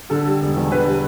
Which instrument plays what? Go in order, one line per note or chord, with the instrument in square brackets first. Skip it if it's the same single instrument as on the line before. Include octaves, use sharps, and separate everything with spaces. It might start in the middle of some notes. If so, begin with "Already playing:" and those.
[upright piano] D3 A4
G3
E1
E2
D3 B4
G3